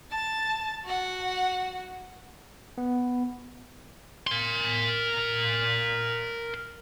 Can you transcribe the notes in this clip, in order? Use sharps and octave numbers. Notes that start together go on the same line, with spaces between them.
A5 A6
F#4 F#5
B3
A#4 C6